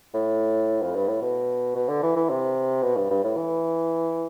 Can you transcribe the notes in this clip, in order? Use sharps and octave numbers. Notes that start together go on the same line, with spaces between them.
A2
F2
G2
A2
B2
B2
D3
E3
E3
C3
B2
G2
G2
A2
E3